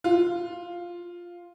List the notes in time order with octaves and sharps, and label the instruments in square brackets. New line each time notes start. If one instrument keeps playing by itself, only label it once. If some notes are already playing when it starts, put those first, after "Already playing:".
[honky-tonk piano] F4